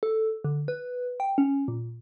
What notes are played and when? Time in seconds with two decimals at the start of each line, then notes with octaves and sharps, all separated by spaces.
0.03 A4
0.44 D3
0.68 B4
1.20 G5
1.38 C#4
1.68 A#2